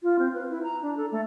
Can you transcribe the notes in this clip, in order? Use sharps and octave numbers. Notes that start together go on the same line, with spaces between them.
F4
C4
B4
E4
A#5
D4
A4
A3